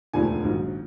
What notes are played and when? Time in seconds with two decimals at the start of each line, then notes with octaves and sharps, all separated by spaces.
0.13 E1 D2 D3 F3 A3 G#5
0.44 A#1 G#2 D#3 F#3